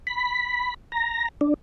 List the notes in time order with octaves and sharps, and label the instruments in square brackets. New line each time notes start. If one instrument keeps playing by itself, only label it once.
[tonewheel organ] B5
A#5
D4